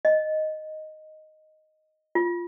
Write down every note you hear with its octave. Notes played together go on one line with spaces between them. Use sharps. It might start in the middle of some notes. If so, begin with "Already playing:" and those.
D#5
F4